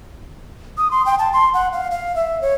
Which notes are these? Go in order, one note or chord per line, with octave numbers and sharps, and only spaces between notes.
D#6
C6
G5
A5
C6
F#5
F5
F5
E5
C#5